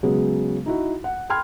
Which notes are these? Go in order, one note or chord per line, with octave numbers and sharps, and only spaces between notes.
C#3 F#3 G#3 B3
D#4 E4 F#4
F#5
G5 B5 C6 F6 G#6